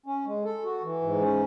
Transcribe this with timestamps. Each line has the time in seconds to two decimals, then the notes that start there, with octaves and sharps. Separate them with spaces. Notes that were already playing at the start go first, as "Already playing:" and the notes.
0.06 C#4
0.25 G#3
0.44 A4
0.64 F#4
0.83 E3
1.02 G#2
1.21 C#4